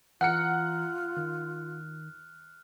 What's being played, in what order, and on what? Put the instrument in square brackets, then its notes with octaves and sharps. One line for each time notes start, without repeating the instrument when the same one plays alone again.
[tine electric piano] E3 A#5 [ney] F4 [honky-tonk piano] F#5 C#7 [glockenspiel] F6 F#6
[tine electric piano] D#3